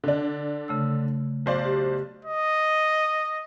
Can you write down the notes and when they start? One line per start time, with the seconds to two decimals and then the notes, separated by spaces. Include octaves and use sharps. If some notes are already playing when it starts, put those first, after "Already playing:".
0.04 D3 D4
0.68 C#3 A3 E6
1.46 B1 C5 D5
1.65 G4
2.25 D#5